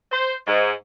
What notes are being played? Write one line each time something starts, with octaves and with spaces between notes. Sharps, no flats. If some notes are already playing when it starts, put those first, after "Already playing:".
C5
G#2